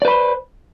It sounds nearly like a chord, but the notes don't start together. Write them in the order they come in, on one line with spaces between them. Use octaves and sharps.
D5 B4 B5 C5